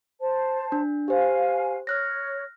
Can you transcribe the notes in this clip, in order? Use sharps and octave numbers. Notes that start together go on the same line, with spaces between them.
C5 A5
D4
G4 C5 F5 G#5
C#5 F6 F#6 A#6